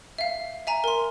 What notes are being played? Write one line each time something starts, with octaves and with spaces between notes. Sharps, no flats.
E5 F5
E5 G#5 A#5
A#4 C6